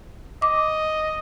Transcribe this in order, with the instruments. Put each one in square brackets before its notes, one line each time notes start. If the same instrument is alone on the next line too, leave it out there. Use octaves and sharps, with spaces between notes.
[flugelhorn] D#5 [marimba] D6